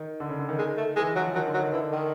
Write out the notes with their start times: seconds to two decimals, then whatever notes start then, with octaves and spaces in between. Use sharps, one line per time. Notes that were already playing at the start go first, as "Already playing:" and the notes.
Already playing: D#3
0.20 D3
0.29 C#3
0.39 D3
0.49 D#3
0.59 G#3
0.77 A3
0.96 E3 G#3
1.10 E3
1.16 F#3
1.22 F3
1.35 D#3 F#3
1.47 D3
1.54 F#3
1.60 D#3
1.72 D3 E3
1.92 D#3